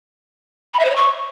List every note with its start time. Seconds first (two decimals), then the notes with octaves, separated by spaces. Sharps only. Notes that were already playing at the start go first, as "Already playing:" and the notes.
0.74 B5
0.79 E5
0.85 C5
0.90 C#5
0.96 C#6